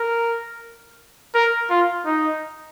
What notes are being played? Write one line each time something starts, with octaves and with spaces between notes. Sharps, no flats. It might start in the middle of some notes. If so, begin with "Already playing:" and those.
Already playing: A#4
A#4
F4
D#4